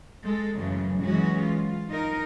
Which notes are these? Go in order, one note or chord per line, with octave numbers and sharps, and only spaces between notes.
G#3 A4
F#2 A2 C#3 E3 F#3
E3 F#3 G#3 C#4 F#4
F4
D#4 A#4